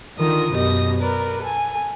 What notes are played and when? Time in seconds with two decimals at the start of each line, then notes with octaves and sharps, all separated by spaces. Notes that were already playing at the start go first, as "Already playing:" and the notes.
0.18 D3 D#3 F4 A#4 D#6
0.53 F#2 B2 G4 D#5 A#6
1.01 A#4 B4 D5
1.42 A4 G#5